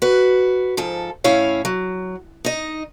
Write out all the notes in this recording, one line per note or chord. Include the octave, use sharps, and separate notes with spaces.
F#4 B4
G#2 F3 A4
A2 C#4 E4 C#5 F5
F#3
D#4 D#5